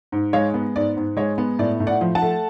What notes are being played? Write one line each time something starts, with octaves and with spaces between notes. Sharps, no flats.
G#2
G#3 C#5 F5
B3
G#2 D5
G#2
G#3 C#5
B3
A2 D5
A2
D5 F#5
F3
F#5 A5
A3